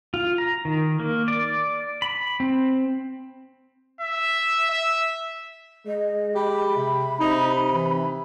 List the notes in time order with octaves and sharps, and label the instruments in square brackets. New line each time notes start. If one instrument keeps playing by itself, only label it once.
[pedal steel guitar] F4
A#5
D#3
A#3
D5
B5
C4
[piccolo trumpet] E5
E5
[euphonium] G#3 [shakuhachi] D#5
[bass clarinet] G4 [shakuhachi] B5
[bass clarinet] C3
[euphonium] C3 [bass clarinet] D#4
[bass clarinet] E3